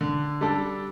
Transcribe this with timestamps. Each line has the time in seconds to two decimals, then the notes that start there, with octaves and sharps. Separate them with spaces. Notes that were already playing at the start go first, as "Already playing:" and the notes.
0.01 D3
0.41 G3 D4 A4